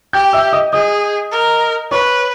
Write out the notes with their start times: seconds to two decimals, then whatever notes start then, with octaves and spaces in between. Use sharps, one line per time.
0.13 G4 G5 G6
0.33 E5 E6
0.53 D#5 D#6
0.73 G#4 D#5 D#6
1.32 A#4
1.91 B4 C#5 C#6